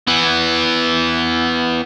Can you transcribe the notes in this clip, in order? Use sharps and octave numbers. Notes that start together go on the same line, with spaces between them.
E3 B3